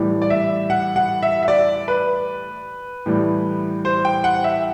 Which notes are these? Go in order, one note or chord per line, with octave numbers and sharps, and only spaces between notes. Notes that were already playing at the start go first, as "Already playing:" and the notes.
Already playing: A2 E3 G3
D5
E5
F#5
F#5
E5
E5
D5
B4
A2 E3 G3
C5
G5
F#5
E5